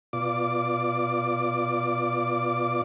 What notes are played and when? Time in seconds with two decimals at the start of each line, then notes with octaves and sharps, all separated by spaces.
0.13 B2 F4 D5 D6